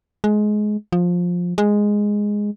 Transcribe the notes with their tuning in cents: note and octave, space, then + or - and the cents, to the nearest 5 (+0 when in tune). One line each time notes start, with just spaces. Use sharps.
G#3 +20
F3 +15
G#3 -5